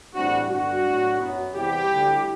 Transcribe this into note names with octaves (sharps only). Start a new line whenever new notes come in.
A2 E3 G3 C4 D4 F#4
G2 D3 G3 B3 D4 F#4
A2 F#3 B3
F#2 F#3 B3
E2 C3 G3 B3 E4 G4
D2 D3 G3